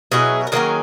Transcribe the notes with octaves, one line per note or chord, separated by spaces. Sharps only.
B2 F#3 C#4 E4 G#4
A#4
D#3 F#3 A#3 C#4 G#4